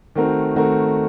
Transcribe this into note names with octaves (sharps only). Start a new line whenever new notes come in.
D#3 A3 C4 F#4 A#4
D#3 A3 C4 F#4 A#4